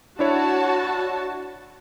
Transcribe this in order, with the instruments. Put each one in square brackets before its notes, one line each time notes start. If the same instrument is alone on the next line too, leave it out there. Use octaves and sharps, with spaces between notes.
[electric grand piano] D4 E4 C#5 [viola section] F#4 A5